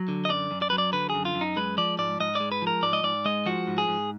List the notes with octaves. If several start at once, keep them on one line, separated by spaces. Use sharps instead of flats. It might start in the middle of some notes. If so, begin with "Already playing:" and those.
Already playing: F#3
D3
D#5
F#2 D5
F#2
D5
F#3 B4
D5
D3 B4
F#2 G#4
F4
F#2
D#4
G#3 B4
F3 D5
G#2 D5
G#2 D#5
G#3 D5
B4
F3 A#4
G#2 D5
D#5
G#2 D5
G#3 D#5
F3 F#4
G#2
G#4
G#2